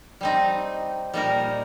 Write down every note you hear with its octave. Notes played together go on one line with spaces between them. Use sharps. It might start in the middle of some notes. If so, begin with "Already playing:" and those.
G3 C4 D#4
A#2 G3 A#3 D#4 A#4